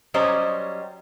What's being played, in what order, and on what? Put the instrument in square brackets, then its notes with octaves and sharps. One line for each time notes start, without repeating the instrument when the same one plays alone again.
[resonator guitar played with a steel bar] F#3 G3 C#4 C5 D5 D#5